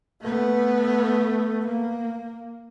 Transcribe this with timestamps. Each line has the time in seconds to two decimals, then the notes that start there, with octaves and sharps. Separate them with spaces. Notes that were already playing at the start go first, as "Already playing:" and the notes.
0.22 A3 B3
1.66 A#3